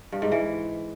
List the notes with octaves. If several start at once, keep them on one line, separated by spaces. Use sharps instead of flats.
G2
G#2
E3